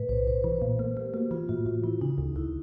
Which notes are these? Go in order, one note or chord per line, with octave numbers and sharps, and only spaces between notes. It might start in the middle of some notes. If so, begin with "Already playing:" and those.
Already playing: A2 B4
B1 C5
B1 C5
E3
A#2
A#3
A#3 G4
A#3 F#4
E3 F4
A2 F#4
A2 F4
E3 E4
C#3 D#4
D2
D2 E4